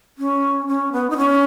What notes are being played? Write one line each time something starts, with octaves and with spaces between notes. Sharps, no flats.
C#4
C#4
B3
D#4
C#4